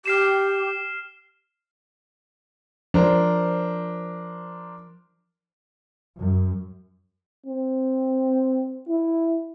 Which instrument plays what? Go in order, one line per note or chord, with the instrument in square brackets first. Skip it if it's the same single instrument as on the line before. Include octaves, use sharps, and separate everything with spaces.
[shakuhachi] G4 [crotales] F6 C7 E7
[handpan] F3 [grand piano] D4 A#4 C5
[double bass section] F#2
[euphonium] C4
E4